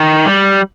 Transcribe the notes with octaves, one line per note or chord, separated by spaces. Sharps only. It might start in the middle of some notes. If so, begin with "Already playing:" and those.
Already playing: D#3
G3